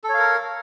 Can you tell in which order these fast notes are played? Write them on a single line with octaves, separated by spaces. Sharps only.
A4 C#5 F5 A#4